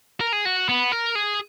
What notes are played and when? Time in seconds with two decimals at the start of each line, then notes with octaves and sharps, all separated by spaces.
0.21 A#4
0.33 G#4
0.45 F#4
0.69 B3
0.92 A#4
1.15 G#4